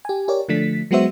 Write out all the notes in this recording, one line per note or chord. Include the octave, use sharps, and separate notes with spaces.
G4 G#5
G4 A#4 C#5 D5
D3 F3 A3 D4 B6
F#3 G#3 B3 F#4 C5 E5